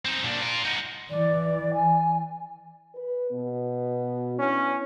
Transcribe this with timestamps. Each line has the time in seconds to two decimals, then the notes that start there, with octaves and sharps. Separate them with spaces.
0.05 C4 D#4
0.24 A#2 D4
0.41 F4 A#4
0.64 D#4 F#4
1.10 E3 D5
1.73 G#5
2.95 B4
3.31 B2 B3
4.39 B3 C#4 D4 E4